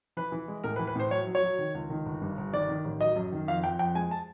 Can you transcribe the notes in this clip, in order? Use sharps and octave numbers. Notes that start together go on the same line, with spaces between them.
E3 B4
E3
G#3
A2 A#4
B4
E3
B4
A2 C5
F#3 C#5
F#3
C#5
F#3
D#3
C#2
D#3
G1
G2
G1
D#3 D5
D#3
A1
F#3 D#5
F#2
D#3
F2 F5
F2 G5
F2 G5
G#3 G#5
A5